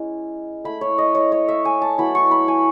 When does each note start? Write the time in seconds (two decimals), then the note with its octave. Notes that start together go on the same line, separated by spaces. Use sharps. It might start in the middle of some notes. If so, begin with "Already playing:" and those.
Already playing: G#3 C#4 E4
0.64 A3 E4 B5
0.81 C#5
0.98 D#5
1.15 C#5
1.32 C#5
1.48 E5
1.65 G#5
1.82 A5
1.98 F#3 B3 E4 B5
2.15 C#6
2.31 B5
2.48 G#5